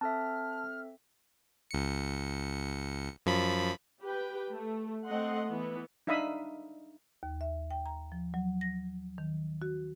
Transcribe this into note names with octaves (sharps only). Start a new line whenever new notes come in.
C4 A4 E5 A5 F6
C#2 C#7
F#2 F3 B5
G4 B4 G5
A3
A3 C4 D#5 F#5 C6
E3 B3
D4 D#4 E5 F5 B5 D#6
D#2
E5
G5
A#5
F3
F#3
A#6
D#3
F#4